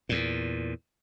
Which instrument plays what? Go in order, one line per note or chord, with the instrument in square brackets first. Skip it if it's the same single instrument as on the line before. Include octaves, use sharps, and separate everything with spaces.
[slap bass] E2 A#2